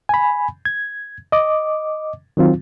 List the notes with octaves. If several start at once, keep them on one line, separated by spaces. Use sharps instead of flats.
G#5 B5
G#6
D#5 D6
D#3 F#3 C4 F4